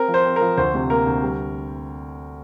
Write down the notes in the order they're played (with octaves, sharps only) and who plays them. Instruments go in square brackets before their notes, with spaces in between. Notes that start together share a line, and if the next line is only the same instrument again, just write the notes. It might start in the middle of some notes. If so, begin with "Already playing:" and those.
Already playing: [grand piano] C4 A#4
F3
C5
C4
A#4
F3
D2 C5
C3
A#3 A#4
D2
G3